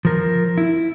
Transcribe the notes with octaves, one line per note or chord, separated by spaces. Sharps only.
F3 A#4
E4